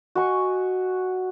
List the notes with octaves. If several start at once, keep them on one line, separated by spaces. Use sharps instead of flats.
F#4 D#5 G#5 C#6